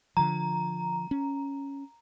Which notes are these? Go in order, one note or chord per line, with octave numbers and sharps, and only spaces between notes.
D3 F3 A#5
C#4